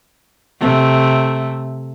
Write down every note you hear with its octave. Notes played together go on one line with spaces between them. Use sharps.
C3 A3